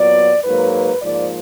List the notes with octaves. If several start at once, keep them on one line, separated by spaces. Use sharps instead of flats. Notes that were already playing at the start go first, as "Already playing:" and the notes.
Already playing: A#2 F#3 B3 D5
G#2 F#3 A#3 B4
B4
G#2 F3 A#3 D5